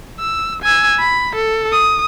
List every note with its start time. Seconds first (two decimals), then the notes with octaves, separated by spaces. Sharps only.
0.19 E6
0.62 G#5 E6
0.99 B5
1.36 A4
1.72 D#6